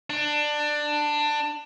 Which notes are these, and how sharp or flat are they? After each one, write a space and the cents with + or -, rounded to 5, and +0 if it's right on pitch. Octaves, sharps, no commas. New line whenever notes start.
D4 +15